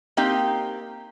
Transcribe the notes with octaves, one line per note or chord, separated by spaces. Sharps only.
A#3 C4 D#4 G4